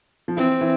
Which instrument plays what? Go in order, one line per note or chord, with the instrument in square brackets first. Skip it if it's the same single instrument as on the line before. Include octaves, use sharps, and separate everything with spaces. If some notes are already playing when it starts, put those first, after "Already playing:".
[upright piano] F3
[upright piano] E3 [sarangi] C4
[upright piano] E3